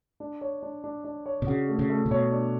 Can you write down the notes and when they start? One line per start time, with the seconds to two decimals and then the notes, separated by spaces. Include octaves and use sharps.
0.20 D4
0.41 C#5
0.63 D4
0.84 D4
1.04 D4
1.26 C#5
1.42 B2
1.47 C#3 F#4
1.69 A3
1.79 C#3
1.90 A3
2.06 C#3
2.11 B2 C#5
2.32 D4